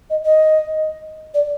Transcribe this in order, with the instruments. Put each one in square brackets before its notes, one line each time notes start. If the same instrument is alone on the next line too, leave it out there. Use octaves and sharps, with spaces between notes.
[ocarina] D#5
D#5
D5